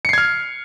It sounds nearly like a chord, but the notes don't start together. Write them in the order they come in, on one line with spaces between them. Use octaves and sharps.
C#7 C7 G#6 F6